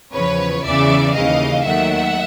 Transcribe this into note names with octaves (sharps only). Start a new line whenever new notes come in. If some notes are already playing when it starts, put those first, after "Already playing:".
E2 C#3 F3 B4 C#5
E2 C#3 E3 D5 E5
D#2 C#3 E3 D#5 F5
D#2 D#3 F#3 A3 E5 F#5